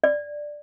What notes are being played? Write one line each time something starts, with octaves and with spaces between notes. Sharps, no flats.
D5